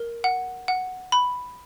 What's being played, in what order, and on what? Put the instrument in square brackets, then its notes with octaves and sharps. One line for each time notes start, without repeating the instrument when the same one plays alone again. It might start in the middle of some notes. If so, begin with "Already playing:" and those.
Already playing: [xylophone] A#4
F#5
F#5
B5